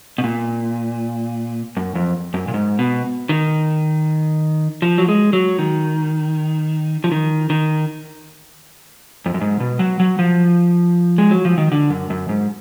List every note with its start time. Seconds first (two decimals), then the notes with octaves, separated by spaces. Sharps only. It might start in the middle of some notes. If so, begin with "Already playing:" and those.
0.18 B2
0.24 A#2
1.77 F#2
1.95 F2
2.34 F#2
2.48 A#2
2.54 G#2
2.79 B2
3.29 D#3
4.82 F3
4.98 F#3
5.08 G#3
5.33 F#3
5.59 D#3
7.04 F3
7.12 D#3
7.50 D#3
9.26 F2
9.34 F#2
9.41 G#2
9.60 B2
9.79 F#3
10.00 F#3
10.19 F3
11.18 G#3
11.31 F#3
11.45 F3
11.58 D#3
11.72 D3
11.90 F#2
12.10 F#2
12.29 G#2